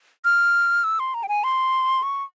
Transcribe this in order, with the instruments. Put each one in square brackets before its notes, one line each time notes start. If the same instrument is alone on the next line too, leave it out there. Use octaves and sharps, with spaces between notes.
[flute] F6
E6
C6
A#5
G5
G#5
C6
C#6